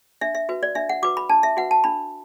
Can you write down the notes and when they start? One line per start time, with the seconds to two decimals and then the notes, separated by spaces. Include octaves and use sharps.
0.21 D4 E5
0.35 E5
0.49 F#4 B4
0.63 D5
0.75 D4 E5
0.89 F#5
1.03 F#4 B4 D6
1.17 B5
1.29 D4 A5
1.43 E5
1.57 F#4 B4 F#5
1.71 A5
1.84 D4 B5